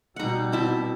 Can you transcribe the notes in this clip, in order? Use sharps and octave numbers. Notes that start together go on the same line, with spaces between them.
B2 G3 D#4 F#5
C4 E4 A5